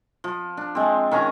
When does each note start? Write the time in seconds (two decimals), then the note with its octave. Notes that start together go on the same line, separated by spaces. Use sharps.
0.24 F3
0.57 D4
0.75 G#3 C4
1.11 D#3 C#4 G#5 A#5